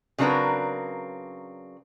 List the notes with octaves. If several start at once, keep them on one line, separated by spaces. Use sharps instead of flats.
C#3 F#3 C4 D4 A#4 B4